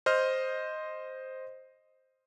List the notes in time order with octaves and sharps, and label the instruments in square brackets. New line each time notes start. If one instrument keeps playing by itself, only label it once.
[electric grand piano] C5 D#5 F6